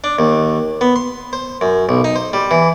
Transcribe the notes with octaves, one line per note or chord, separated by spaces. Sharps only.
D4
D#2
B3
C6
C5
F#2
B1
D#4
C5
G3
E3